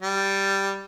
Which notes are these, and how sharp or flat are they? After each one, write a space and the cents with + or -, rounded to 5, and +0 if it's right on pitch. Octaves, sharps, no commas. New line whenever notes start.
G3 +0